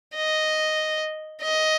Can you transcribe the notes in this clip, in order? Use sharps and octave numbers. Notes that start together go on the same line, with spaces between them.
D#5
D#5